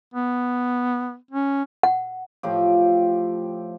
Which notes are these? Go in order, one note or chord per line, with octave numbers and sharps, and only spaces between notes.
B3
C#4
F#5
A2 F3 G4